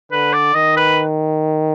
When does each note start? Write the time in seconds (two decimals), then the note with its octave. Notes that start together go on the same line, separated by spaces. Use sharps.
0.12 D3 B4
0.33 D5
0.55 D#3 D#5
0.77 B4